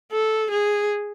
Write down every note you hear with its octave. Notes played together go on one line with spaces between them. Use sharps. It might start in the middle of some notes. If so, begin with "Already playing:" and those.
A4
G#4